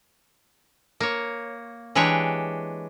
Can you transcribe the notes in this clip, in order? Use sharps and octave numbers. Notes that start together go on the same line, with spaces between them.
A#3 C#5
E3 G#3 D4 G4 C#5 G5